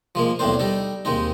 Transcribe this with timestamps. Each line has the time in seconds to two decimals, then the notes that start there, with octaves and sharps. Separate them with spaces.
0.15 F3 G#3 A#3
0.39 B1 E2 A2 C4 D4 C5
0.59 G3 D#4 A4
1.05 D#2 G#3 C4 D#4